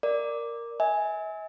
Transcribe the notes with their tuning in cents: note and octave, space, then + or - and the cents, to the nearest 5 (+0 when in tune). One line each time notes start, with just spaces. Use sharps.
A#4 +0 D5 +0
E5 -40 G#5 +0